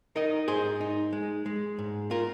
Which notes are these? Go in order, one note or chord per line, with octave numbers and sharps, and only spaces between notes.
D#4 A#4 D#5
G#2 G#4 C5
D#4
G#3
G#3
G#2
F4 A#4